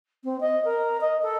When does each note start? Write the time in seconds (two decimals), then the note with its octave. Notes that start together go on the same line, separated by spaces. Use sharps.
0.24 C4
0.40 D#5
0.64 A#4
1.01 D#5
1.22 A4